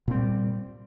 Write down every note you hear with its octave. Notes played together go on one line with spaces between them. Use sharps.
A#2 G3 C4